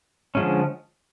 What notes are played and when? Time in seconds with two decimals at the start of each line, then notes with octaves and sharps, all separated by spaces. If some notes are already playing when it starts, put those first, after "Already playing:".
0.35 D3 F3 G#3 C#4